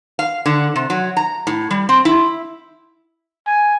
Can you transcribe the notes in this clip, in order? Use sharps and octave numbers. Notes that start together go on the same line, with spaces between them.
F5
D3
C3
F#3
A#5
A2
G3
C4
E4
G#5